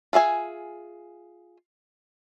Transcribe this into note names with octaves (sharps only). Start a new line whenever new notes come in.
F4 G#4 E5 G#5